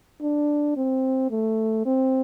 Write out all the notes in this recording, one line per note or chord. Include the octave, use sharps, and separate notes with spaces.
D4
C4
A3
C4